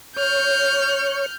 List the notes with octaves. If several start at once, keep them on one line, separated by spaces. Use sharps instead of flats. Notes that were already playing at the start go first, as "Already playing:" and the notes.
C#5 F6 G6